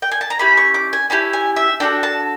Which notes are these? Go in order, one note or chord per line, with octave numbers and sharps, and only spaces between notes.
G5
G#5
A5
A#5
C#4 E4 G4 B5
C#6
D6
G#5
C#4 E4 G4 A5
G#5
E5
D4 F#4 A4 G5
A5